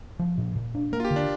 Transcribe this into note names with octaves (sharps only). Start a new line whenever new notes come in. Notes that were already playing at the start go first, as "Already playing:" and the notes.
F3
A#2
A#2
D4
A#3 A#4
F4
G4
D3
D4